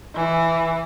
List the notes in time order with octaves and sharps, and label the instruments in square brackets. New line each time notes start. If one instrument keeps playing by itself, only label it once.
[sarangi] E3